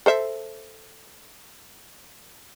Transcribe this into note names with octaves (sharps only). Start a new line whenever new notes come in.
A4 C5 E5